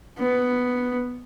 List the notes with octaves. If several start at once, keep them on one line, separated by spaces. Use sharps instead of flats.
B3